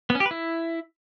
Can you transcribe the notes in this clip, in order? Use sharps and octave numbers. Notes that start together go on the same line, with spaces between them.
B3
C#4
G4
B4
E4